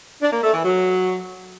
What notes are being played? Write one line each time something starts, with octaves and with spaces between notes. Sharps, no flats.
D4
A#3
A3
E3
F#3